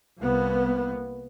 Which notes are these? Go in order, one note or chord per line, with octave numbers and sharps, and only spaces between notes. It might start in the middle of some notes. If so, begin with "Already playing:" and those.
C2 A#3 B3